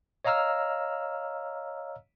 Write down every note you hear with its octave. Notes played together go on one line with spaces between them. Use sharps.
C#5 D#5 F5 A#5 E6 F6